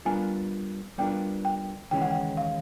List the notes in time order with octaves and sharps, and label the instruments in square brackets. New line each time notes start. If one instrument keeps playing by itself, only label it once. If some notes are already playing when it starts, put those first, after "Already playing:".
[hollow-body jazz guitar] G3 B3 D4 F4 A#4 [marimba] G#5
[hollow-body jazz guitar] G3 B3 D4 F4 A#4 [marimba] G5
[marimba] G5
[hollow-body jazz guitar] D#2 C#3 E3 G#3 C#4 [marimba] G5
[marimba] F#5
G5
F5